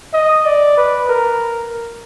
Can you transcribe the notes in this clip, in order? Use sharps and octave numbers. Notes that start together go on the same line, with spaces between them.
D#5
D5
B4
A#4